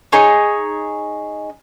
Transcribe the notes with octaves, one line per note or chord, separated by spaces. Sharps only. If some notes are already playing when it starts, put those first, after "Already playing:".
D#4 G#4 C#5